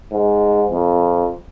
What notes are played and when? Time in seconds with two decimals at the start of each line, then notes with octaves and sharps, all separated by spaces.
0.12 G#2
0.71 F2